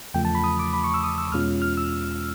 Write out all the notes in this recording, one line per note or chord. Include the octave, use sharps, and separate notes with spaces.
E2 C#3 F3 A3 G5
A5
B5
D#6
D6
B5
C#6
E6
D#6
E6
E2 B2 G#3 C#4 F4 F6
F6
E6